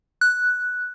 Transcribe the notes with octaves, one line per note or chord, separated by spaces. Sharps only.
F#6